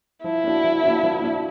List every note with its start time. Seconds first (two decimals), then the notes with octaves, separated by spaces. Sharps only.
0.24 F3 E4
0.44 A#3 D4 F#4
0.64 F3
0.83 A#3 D4 F#4
1.03 F3
1.21 A#3 D4 F#4